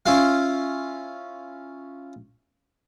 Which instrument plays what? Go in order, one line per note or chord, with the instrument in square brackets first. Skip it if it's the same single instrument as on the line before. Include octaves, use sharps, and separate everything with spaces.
[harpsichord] C#4 E4 F4 F5